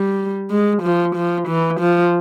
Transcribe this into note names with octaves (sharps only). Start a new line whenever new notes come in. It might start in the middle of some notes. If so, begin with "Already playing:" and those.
Already playing: G3
G#3
F3
F3
E3
F3